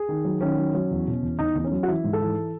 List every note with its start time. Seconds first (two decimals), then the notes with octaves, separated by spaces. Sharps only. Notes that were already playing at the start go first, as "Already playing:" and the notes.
Already playing: G#4
0.09 D#3
0.25 F#3
0.41 D#3 C#4
0.57 F#3
0.75 F#3
0.90 E2
1.07 B2
1.22 E2
1.39 E2 D#4
1.55 E2 D#4
1.64 C#4
1.72 F#3
1.83 F#4
1.88 E3 E4
2.04 G#2
2.13 A4
2.21 E3